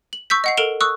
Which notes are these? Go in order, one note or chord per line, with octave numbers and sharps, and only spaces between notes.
F#7
C#6 E6 G6 B6
D#5 F#5 C7
A4 A#4 D7 E7 F7 G7
C#6 D#6 E6 F#6